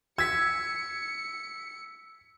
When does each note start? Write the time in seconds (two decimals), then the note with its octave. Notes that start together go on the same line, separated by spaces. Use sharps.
0.18 E6 G#6 B6 C#7